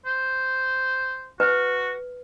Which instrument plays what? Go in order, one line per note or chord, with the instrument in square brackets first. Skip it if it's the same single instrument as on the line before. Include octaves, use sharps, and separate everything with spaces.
[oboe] C5
[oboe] F#4 [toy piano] B4